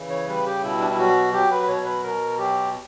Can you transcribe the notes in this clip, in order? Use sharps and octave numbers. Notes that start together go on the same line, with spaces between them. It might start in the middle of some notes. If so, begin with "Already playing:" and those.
Already playing: C#3 E3
C#5
G3 B4
G4
B2 E4
D4
E4
F#3 F#4
F#3 G4
B4
B4
B2 C#5
B4
B2 A#4
F#3 G4